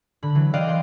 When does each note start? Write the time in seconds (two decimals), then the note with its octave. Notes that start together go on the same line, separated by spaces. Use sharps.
0.22 D3 B5
0.35 E3 F#3
0.54 D5 D#5 F5 G5 C6 F#6
0.67 C5 G5 C6